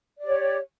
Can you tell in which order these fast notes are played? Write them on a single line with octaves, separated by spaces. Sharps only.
D5 G4 C#5